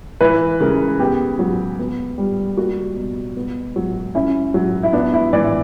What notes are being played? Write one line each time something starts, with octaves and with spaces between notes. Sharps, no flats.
E3 B4
C#3 A#4
B3 G4
F#3
B3
G3
A#3 F#4
B2
B3
F#3
C#4 E4
F#3
E4
B3 D4
E4
E3 D5